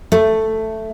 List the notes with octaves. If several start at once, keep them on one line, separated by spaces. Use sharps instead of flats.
A3